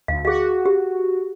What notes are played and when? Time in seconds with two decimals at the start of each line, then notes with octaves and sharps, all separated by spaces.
0.08 D2 F5
0.25 F#4 G#4 F5
0.66 G4